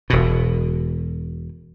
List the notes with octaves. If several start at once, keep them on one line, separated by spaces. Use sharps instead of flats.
E1 B2